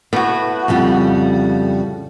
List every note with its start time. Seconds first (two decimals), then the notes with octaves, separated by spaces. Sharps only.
0.13 A2 B3 F#4
0.68 F2 C#3 G3